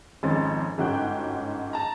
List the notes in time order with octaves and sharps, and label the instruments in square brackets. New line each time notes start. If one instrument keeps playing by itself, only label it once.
[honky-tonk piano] G#1 F2 G#3 C#4 C5 A6
G1 G#2 C#4 F#4 G5 F#6
A5 A#5